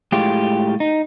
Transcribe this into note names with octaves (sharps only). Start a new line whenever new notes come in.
A2 G#3 F4 G4
D#4